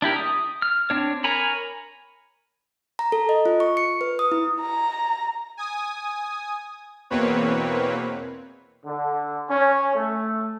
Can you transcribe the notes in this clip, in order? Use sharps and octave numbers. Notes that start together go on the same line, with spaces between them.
D4 E4 G4 A#4
D#6
F6
C4 D4 C#5
A#4 C#5 G#5 A#5 B5
A#5
A4
D#5
F4
C#6
C#7
B4
D#6
E4
A#5
G#5 D#6
E2 B2 A#3 C4 B4 C#5
D3
C#4
A3